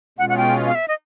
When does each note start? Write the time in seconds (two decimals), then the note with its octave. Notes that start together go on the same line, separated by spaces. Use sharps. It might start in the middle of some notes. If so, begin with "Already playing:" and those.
0.18 B2 G#3 C#4 F4 F#5
0.29 F#5
0.37 G5
0.66 F5
0.75 E5
0.88 D#5